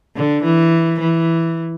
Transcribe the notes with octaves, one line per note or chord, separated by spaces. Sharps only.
D3
E3
E3